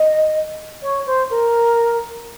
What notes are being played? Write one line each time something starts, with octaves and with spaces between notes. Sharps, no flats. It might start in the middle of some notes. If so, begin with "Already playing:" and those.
Already playing: D#5
C#5
C5
A#4